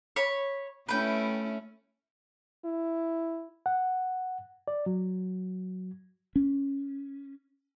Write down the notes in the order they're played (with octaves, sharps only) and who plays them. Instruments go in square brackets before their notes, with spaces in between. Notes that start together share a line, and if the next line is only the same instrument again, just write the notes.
[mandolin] C#5 B5
[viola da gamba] A3 C#4 E4 [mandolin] B4 G5
[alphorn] E4
[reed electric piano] F#5
D5
F#3
[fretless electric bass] C#4